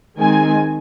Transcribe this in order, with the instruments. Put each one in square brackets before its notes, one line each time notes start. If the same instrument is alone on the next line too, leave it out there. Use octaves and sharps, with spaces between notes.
[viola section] D#3 G#3 C4 G#5